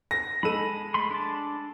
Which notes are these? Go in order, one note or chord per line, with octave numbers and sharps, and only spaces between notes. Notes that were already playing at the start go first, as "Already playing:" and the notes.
A#6
G#3 A4 B5 D#7
A3 B5 C6
D4 A5